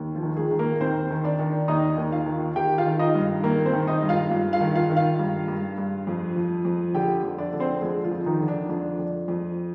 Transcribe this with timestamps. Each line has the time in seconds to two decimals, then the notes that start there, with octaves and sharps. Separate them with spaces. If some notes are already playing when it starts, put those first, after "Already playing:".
Already playing: D#2
0.15 F3 F4
0.23 D#3
0.36 G#3 G#4
0.51 D#3
0.59 A#3 A#4
0.80 D#2 C4 C5
1.10 D#3
1.24 D4 D5
1.39 D#3
1.68 D#2 D#4 D#5
1.97 D#2
2.12 F4 F5
2.26 D#3
2.55 D#3 G4 G5
2.78 F4 F5
2.85 D#3
2.99 D#4 D#5
3.15 G2
3.43 D#3 A#3 A#4
3.65 C4 C5
3.73 D#3
3.87 D#4 D#5
4.03 G2
4.09 F4 F5
4.31 G2
4.53 F4 F5
4.60 D#3
4.75 F4 F5
4.90 D#3
4.97 F4 F5
5.19 G2
5.48 G2
5.78 G2
6.07 F2
6.36 F3
6.65 F2
6.94 D3 G4 G5
7.24 F2
7.39 D4 D5
7.53 D3
7.60 C4 C5
7.82 F3 G#3 G#4
8.04 F3 F4
8.11 F2
8.26 D#3 D#4
8.41 D3
8.48 D4
8.69 F2 D4
8.99 F2
9.28 F2